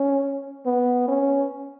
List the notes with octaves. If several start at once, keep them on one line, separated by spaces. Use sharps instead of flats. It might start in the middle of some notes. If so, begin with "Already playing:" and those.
Already playing: C#4
B3
C#4